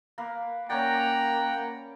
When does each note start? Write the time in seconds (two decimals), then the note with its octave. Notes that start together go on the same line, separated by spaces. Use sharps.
0.18 A#3 A#4 B4
0.69 A#3 C#4 C#5 D5 F#5 G5 A#5